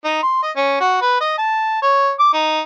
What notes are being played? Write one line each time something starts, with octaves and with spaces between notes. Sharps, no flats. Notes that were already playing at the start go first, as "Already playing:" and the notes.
D#4
C6
D#5
C#4
F#4
B4
D#5
A5
C#5
D6
D#4